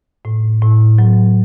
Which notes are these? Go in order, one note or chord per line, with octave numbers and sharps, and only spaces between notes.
A2
A2
F#3